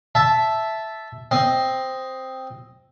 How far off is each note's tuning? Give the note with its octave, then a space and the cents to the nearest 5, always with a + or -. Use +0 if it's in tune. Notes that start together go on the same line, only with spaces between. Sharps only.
E5 +0 A5 -10
C4 +0 D#5 +5